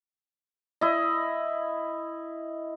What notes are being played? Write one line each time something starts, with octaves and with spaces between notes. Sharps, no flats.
E4 D#5